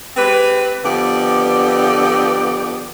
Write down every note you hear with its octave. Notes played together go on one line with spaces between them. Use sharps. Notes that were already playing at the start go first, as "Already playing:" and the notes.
G#3 C4 G4 B4
F2 D3 B3 G4 B4 D5